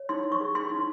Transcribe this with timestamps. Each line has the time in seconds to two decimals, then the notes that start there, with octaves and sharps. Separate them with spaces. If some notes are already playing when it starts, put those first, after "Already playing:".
Already playing: C#5
0.09 D#4 C6
0.32 C#6
0.41 G#4
0.55 C6
0.72 D#4